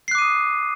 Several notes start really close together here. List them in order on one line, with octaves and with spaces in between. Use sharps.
C7 F#6 D6 D#7 D#6